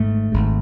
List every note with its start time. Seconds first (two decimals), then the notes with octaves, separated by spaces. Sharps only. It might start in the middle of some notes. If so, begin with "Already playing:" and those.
Already playing: G#1 G#2 A3
0.32 G#1 G#2